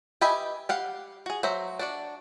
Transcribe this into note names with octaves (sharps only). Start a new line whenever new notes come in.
G4 B4 D#5 E5 G#5
G4 F5 F#5
F#4 G#4
F#3 C5 E5 A#5
D4 F#4 D5